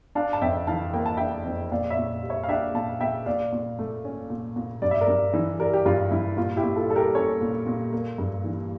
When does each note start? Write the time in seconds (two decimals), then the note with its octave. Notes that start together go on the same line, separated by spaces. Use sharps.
0.15 D4 F5 A5
0.33 A5
0.42 F2 E5 G5
0.67 E3 F5 A5
0.93 A#3 G5
1.06 A5
1.17 D4 E5 G5
1.45 F2
1.72 A#2 D5 F5
1.90 C#5 E5
1.97 A#2
2.22 G3
2.30 C#5 E5
2.43 F5
2.49 D4 E5 G5
2.75 A#2 F5 A5
3.00 A#2 E5 G5
3.26 A#2 D5 F5
3.53 A#2
3.79 A3
4.05 C#4
4.30 A#2
4.56 A#2
4.82 G2 D5
4.91 E5
5.01 A#4 D5
5.08 G2
5.34 E3
5.60 G3 A#4 D5
5.73 G4
5.86 G2 F4
6.11 G2 E4
6.37 A#2 F4
6.57 E4 G4
6.63 A#2
6.76 F4 A4
6.89 G3 A4
6.96 G4 A#4
7.15 C#4 A4 C#5
7.41 A#2
7.67 A#2
7.93 A#3
8.18 G2
8.44 E3